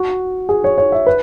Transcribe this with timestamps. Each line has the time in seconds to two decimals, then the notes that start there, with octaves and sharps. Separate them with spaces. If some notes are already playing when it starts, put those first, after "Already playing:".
Already playing: F#4
0.49 G#4
0.64 C#5
0.78 C#5
0.92 E5
1.07 B4